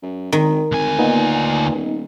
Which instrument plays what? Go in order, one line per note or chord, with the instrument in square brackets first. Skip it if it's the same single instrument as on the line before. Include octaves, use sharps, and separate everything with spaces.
[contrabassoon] F#2
[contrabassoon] G#1 [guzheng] D#3
[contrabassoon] G#1 [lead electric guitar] D2 G#5
[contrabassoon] A#2 [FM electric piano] A#3 B3 D#4
[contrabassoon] D#1